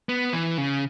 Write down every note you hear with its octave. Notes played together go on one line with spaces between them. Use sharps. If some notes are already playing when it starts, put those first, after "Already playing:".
B3
E3
C#3